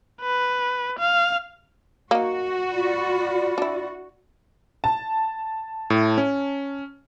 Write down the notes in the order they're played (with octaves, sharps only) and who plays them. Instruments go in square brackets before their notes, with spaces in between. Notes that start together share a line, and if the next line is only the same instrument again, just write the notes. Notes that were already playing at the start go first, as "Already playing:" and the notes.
[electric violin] B4
F5
[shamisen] A#3 D#4 [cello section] F#4
[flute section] F4 D5 B5
[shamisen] D4 E4
[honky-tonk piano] A5
[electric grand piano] A2
C#4